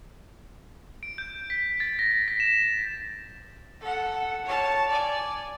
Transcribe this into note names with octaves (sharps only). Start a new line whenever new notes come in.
D7
G6
B6
A6
A#6
B6
E7
A4 F#5
C#5 A5
D5 G#5